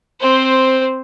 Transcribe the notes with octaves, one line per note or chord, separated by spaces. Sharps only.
C4 C5